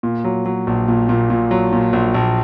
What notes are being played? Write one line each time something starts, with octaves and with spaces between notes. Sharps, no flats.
A#2
F#3
F#3
A#1
A#2
A#2
A#2
F#3
A#2
A#1
A#1